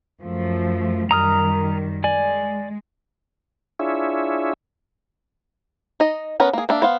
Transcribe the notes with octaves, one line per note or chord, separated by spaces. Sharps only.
F#2 F3 A3
F#2 D#3 G3 A#5 D#6 F6
G#3 D5 G#5
D4 E4 F4 G#4 C#5 E5
D#4 D#5
B3 C#4 A#4 B4
A#3 G#4
A#3 D4 E5
B3 C5 F5